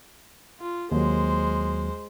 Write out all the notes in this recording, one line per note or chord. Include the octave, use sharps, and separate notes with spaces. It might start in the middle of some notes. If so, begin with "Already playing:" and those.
F4
D#2 F#3 G#3 C5